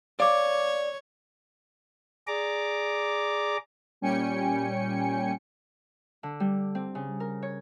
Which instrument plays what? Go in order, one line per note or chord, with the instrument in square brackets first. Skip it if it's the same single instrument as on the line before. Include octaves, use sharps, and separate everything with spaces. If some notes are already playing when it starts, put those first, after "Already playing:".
[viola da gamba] C#5 [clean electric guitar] D5 [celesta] F5 D6
[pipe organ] G#4 D5 A#5 D6
[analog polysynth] A#2 G3 C#4 G5 G#5 C#7
[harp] D3
G3
C4
C#3
A#4
C#5